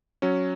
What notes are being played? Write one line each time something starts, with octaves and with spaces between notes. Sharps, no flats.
F#3 C#4